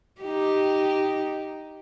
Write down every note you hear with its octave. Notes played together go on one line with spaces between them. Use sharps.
D#4 G4